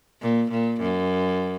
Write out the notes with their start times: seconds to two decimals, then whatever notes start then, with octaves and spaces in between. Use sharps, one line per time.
0.22 A#2
0.51 A#2
0.80 F#2